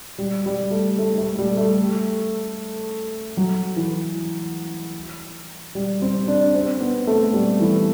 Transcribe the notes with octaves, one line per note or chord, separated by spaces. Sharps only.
G3
G3
A3
A3
A3
G3
A3
F#3
E3
G3
C4
D4
C4
B3
A3
G3
E3